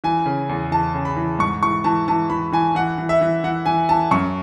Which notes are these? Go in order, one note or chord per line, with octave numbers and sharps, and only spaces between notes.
E3 G#5
C#3
E2
E3 A5
C#3
B5
E3
G#2 C#6
E3 C#6
E3 A5
E3 A5
E3 B5
E3 G#5
E3 F#5
E3
E5
E3
E3 F#5
E3 G#5
E3 A5
F#2 C#6